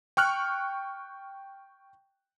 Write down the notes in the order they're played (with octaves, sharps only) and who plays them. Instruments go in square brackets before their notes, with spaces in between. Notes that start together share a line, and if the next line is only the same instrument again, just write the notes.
[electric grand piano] G5 C#6 F6 F#6